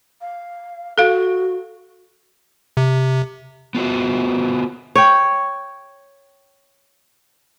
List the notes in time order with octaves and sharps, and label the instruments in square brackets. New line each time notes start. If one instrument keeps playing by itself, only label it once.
[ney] F5
[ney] F#4 [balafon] A4 F5
[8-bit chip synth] C3
[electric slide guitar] B3 F4 F#4 C5
[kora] C#5 G5